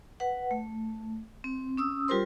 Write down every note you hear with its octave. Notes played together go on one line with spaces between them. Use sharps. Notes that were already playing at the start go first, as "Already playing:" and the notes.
B4 F#5
A3
C4
C#4 D#6 E6
G3 F4 G4 A#4 C5 C6